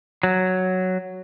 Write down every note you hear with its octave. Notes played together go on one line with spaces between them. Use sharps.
F#3